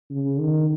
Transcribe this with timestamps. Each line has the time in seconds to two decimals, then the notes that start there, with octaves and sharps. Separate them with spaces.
0.10 C#3
0.40 D#3